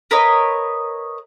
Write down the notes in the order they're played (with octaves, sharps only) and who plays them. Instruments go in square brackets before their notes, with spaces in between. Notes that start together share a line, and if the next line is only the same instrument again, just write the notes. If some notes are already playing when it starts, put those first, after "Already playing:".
[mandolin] A#4 B4 C#5 D#5